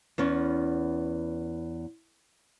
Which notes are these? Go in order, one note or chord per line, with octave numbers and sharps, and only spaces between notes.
E2 B3 C#4